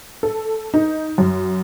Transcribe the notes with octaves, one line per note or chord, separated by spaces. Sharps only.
A4
D#4
F#2